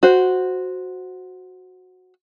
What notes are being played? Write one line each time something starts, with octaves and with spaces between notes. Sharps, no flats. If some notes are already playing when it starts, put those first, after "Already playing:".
F#4 C5